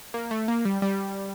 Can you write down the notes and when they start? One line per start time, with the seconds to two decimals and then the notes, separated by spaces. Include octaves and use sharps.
0.14 A#3
0.31 A3
0.48 A#3
0.65 G3
0.82 G3